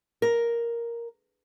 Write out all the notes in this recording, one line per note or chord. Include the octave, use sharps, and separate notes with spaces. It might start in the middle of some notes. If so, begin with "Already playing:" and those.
A#4